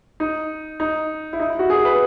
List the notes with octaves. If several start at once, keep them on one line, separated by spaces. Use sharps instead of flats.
D#4
D#4
E4
D#4
E4
F#4
G#4
B4